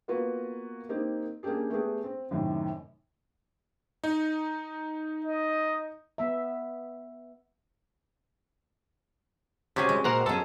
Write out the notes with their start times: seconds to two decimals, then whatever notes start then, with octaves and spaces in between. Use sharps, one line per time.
0.08 A#3 B3 F4 F#4 A#4 B4
0.89 A#3 C4 D#4 G4
1.43 A#3 C#4 D4 G4 G#4
1.70 A3 B3 G4 G#4
2.04 C4
2.31 F#2 A2 C3 D#3
4.04 D#4
5.25 D#5
6.18 B3 E5
9.76 C3 C#4 F#4 G#4
9.89 G#3
10.04 A#2 A#4 C5 F#5 A#5
10.26 F#2 C#4 G#4 A4 A5